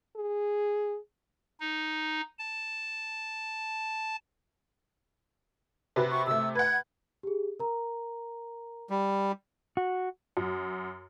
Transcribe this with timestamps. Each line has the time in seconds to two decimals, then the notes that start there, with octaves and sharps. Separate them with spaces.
0.16 G#4
1.60 D#4
2.39 A5
5.96 C3 F#4 B4
6.11 C#6
6.27 C3 A3 E6
6.55 B4 F#5 G#6
7.23 G4 G#4
7.59 A#4 A#5
8.90 G3
9.77 F#4
10.37 F#2